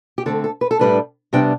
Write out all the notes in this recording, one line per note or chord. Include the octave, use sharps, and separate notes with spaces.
G4
D3 A3 C4 A4
A4
B4
A4
A2 G3 D4 B4
C3 G3 B3 D4 G5